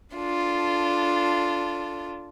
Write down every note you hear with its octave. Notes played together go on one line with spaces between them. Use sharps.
D4 F4 A4